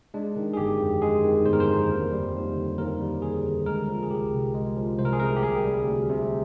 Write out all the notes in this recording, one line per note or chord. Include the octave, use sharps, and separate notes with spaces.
G#3 D4
D#3
G#4
G1 G4
F2
G#3 G#4
D#3
G1 C5
A#4
C5
F2
D#2
G3
D#2
D3
D#2 A#4
G3
D#2 G#4
D3
G#3 A#4
F3
G#4
C2 G4
C3
G#3
F3
C2 C5
A#4
G#4
C3 A#4
G4
D2 G#4
G3
D2
C3